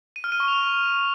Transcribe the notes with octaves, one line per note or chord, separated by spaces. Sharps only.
D#7
F6
D#7
C#6
F7